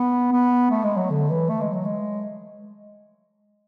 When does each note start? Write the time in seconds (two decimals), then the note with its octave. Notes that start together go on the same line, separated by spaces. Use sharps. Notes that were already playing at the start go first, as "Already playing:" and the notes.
Already playing: B3
0.32 B3
0.71 A3
0.84 G#3
0.97 F#3
1.10 D3
1.30 E3
1.49 A3
1.61 G#3
1.73 F#3
1.85 G#3